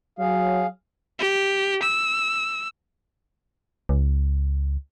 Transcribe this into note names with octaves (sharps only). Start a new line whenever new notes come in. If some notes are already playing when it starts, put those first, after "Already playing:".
F#3 G#4 F5
G4
E6
C#2